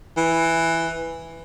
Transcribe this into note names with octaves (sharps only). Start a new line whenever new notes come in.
E3